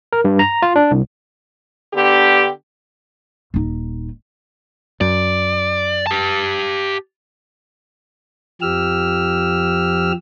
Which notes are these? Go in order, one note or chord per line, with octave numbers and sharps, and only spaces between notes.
A#4
G2
A#5
F4
D4
C2
D3 B3 D4 G4
D#1 D#4
F#2 D5
G4 A5
F2 F3 G4 E6 F6